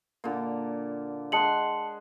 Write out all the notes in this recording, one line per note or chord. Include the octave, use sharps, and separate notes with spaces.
A#2 D3
G#3 F#5 A5 C6 C#7 F#7